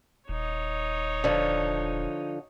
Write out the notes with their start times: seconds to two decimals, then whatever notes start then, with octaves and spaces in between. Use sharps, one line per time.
0.29 D#1 D#4 C#5
1.24 D3 F3